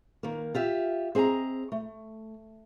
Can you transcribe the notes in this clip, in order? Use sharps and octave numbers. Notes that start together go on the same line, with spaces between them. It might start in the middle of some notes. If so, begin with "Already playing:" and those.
D#3 A#3
F4 G4 E5
C4 G#4 D#5 G#5 A#5
A3